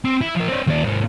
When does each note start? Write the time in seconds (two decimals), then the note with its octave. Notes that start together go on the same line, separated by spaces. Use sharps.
0.05 C4
0.21 E4
0.36 F3 A#4
0.49 C4 D4
0.67 D#2 D5
0.85 G#2 A#3